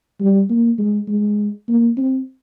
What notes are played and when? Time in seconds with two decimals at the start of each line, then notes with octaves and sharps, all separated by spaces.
0.20 G3
0.50 A#3
0.78 G#3
1.08 G#3
1.68 A#3
1.97 C4